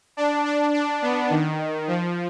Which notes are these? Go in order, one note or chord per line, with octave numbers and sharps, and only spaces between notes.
D4
D4
D4
B3
D#3
F3